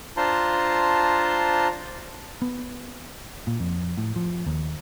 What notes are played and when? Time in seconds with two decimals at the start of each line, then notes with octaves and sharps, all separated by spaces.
0.17 D4 F4 C5 A5 A#5 C6
2.42 B3
3.47 A#2
3.60 F2
3.98 A2
4.16 F3
4.46 D#2